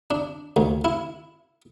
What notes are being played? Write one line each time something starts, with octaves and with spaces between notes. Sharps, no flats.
D4
D2
E4